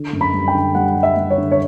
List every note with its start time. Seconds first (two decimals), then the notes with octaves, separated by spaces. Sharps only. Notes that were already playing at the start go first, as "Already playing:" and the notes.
Already playing: D3
0.13 F#2
0.21 B5
0.33 G3
0.48 G5
0.55 D3
0.75 G3 F#5
0.96 G3
1.03 E5
1.17 G3
1.30 C#5
1.38 D3
1.52 C#5